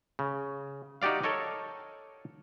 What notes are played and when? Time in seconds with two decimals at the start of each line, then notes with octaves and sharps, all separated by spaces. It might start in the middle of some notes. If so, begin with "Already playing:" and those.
0.19 C#3
1.02 D#4 F#4 G4 D5 F5
1.23 A4 A#4 C#5 D#5